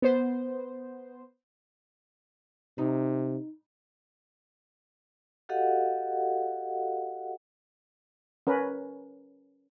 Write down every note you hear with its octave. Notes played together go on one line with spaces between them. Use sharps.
B3 C5
C3 D#4
F#4 G4 A4 D#5 F5 F#5
C#4 A#4 B4